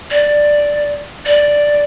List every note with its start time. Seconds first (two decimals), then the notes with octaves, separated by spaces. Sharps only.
0.10 D5
1.25 D5